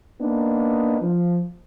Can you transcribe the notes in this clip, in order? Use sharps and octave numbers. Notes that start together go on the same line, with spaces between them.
A#3 B3 D4 D#4
F3